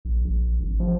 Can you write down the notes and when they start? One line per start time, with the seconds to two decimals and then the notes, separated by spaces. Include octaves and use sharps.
0.05 A#1
0.25 A#1
0.60 G#1
0.80 F3